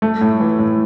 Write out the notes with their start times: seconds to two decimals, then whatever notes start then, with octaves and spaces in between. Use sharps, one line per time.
0.02 A3
0.21 A2
0.40 E3
0.59 A2